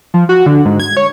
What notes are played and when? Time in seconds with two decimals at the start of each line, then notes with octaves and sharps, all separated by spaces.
0.14 F3
0.29 F#4
0.46 D3
0.65 G#2
0.80 G#6
0.97 C#5